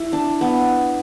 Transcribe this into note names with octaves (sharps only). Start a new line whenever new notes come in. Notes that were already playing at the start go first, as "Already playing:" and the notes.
Already playing: E4
D4
B3